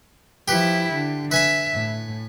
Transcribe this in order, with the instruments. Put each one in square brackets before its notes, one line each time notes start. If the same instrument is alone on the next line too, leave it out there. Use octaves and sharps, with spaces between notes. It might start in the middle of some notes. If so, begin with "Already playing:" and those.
[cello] F3 E4 [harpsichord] G4 B4
[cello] D3
[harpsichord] B4 G#5 B5 [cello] E5
[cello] A2